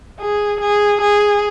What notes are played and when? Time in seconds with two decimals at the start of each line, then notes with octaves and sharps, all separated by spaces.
0.22 G#4
0.61 G#4
1.01 G#4